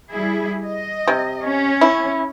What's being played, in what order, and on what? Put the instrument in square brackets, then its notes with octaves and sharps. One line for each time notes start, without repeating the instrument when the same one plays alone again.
[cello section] G3 E4 G#4
D#5
[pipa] C3
[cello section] C#4
[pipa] E4